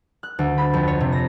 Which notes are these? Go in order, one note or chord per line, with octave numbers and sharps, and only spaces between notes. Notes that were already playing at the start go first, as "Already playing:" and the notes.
F#6
D2
B5
F2
C#5
C3
A#6